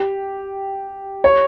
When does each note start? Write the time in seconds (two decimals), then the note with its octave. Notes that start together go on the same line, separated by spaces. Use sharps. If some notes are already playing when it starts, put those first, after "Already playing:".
Already playing: G4
1.24 C#5